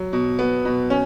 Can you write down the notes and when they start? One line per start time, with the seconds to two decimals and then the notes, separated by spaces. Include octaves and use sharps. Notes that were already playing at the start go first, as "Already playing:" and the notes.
Already playing: F#3
0.13 B2
0.39 B3
0.65 B2
0.90 C#4